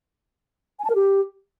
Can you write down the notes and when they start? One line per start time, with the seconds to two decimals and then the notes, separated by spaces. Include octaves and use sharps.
0.79 G#5
0.84 A5
0.90 A#4
0.95 G4